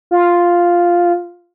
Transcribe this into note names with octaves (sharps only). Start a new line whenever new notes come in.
F4